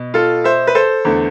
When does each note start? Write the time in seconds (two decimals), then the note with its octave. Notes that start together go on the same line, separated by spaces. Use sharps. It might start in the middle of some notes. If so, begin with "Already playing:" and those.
Already playing: B2
0.14 F4 A4
0.44 C5 E5
0.67 B4
0.75 A4 C5
1.05 E2 D3 A3